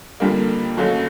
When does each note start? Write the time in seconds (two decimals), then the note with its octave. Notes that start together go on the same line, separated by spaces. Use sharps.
0.20 F2 D3 G3 A#3
0.77 D#2 C#3 F#3 A3